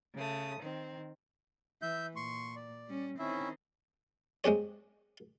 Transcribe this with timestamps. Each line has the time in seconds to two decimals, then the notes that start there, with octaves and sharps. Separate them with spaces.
0.15 C#3 A3 D#6
0.60 D#3 C4
1.82 E3 E5 G6
2.16 A#2 C6 C#6
2.56 D5
2.88 G3 C#4
3.19 D#3 C4 C#4 E4 E5
4.44 G#3 C4 G4 C#5